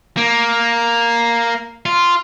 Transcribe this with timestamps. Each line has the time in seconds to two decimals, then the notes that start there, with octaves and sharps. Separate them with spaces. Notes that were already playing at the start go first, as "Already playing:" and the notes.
0.17 A#3
1.86 F4